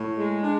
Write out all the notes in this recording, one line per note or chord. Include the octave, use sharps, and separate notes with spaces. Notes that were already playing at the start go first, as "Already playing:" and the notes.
Already playing: A2
G#3
D4